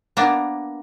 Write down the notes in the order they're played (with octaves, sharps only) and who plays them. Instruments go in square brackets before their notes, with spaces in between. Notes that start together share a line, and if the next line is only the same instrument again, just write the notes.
[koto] A#3 B3 D4